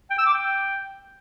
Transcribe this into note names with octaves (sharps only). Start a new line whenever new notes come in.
G5
E6
D6
G5